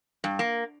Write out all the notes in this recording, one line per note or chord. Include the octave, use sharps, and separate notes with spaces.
G2
A#3